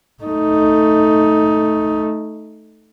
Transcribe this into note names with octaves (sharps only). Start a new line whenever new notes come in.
A3 D#4